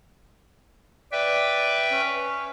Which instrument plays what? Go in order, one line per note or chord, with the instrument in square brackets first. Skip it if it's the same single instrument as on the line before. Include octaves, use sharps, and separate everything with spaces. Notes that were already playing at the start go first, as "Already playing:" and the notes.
[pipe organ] B4 E5 G5 [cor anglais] D5
[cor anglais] C#4